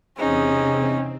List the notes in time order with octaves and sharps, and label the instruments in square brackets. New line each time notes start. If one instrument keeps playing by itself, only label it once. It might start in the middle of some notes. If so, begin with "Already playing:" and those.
[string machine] E2 C3 C4 [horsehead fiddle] C#4 [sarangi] D#4 [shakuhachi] G#4